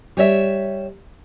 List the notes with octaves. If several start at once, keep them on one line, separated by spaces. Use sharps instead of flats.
G3 C#5 E5